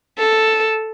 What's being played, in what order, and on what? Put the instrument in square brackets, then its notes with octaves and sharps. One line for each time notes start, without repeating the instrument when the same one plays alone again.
[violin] A4